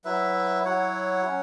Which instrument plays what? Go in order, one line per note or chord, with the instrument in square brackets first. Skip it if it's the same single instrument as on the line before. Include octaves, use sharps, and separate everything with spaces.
[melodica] F#3 E4 B4 E5
F#3 E4 C#5 F#5
F#3 C#4